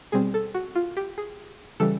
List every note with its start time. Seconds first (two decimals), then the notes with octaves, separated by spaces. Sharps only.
0.12 B2 G3 C4 G#4
0.34 A4
0.54 F#4
0.75 F4
0.97 G4
1.18 G#4
1.80 C#3 E3 G3 A4